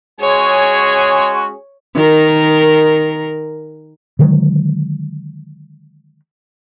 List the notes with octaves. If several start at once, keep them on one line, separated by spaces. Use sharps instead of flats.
G#3 C#4 F#4 G#4 C#5 G#5
D#3 A#4
D3 D#3 F#3 G#3